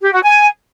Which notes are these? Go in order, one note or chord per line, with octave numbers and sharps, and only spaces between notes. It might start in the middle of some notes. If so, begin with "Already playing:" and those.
G4
F#4
G#5